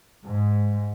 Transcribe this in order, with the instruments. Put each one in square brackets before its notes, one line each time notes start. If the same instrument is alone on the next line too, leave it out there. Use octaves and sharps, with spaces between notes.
[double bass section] G#2